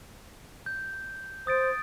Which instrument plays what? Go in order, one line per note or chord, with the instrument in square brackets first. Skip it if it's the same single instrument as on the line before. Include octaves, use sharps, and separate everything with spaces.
[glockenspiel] G6
[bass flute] C5 [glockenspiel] D#6 A6 D7